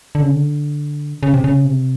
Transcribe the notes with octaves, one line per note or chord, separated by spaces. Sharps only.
D3
C#3
D3
C#3
C3
C#3
C3